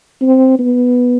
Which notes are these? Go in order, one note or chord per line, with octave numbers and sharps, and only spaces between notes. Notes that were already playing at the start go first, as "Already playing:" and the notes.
C4
B3